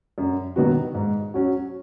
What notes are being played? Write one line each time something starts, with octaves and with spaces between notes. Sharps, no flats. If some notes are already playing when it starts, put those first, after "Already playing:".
F#2
D#3 F#3 B3 F#4
G#2
F#3 C#4 F#4